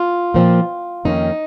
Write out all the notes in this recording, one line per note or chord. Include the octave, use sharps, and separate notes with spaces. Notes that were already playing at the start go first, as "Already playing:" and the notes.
Already playing: F4
A#2 F3 C4
F2 D#3 A#3 C#4 D#4